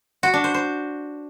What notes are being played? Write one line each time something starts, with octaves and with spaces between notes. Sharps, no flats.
F#4
D4
C5
C5